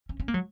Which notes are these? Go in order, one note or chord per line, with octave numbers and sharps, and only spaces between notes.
C#4
C#4
A#3
F#3